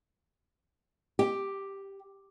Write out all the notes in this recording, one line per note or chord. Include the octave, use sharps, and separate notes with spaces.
G4